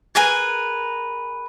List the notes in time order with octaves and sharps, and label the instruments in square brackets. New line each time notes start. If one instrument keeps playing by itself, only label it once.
[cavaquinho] G#4 A#4 B4 G#5